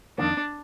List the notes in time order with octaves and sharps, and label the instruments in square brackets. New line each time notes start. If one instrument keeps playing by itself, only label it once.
[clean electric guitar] F2 D#3 A#3 [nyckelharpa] D4